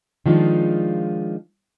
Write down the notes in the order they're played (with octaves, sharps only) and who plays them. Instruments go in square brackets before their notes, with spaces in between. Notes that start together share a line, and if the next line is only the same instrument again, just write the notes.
[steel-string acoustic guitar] D#3 F3 G#3 D4 D#4 F4